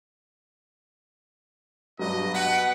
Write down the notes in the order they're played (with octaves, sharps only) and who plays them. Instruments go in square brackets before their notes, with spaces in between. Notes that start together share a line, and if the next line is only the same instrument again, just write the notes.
[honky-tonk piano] G2 F#3 [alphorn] B2 [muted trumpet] D#5
[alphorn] B2 [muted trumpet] B4 [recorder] F#5 [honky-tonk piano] A5 F#6